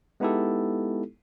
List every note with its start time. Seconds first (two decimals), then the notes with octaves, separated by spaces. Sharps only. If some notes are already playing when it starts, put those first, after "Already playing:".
0.20 G#3 B3 D#4 E4 G4 A4